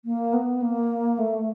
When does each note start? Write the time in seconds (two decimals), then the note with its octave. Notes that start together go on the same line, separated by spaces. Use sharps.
0.05 A#3
0.33 B3
0.62 A#3
1.19 A3